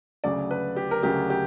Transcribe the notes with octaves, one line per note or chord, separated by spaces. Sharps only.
D2 C#3 F#3 D5
B4
G4
A#4
D2 C#3 F#3 G4
G4